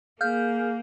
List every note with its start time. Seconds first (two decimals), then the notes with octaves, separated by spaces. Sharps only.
0.21 A#3 G#4 F5 F6 G6